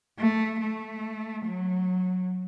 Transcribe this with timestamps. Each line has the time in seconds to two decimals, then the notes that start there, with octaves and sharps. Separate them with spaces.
0.19 A3
0.61 A3
1.45 F#3